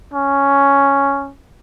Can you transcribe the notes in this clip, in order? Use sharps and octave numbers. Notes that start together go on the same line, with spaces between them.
C#4